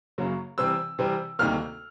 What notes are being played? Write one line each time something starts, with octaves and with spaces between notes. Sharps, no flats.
F#2 C#3 F#3 A#3 C#4
C3 E3 G3 C4 E6
C3 E3 G3 C4
D2 C3 D#3 G3 A#3 F6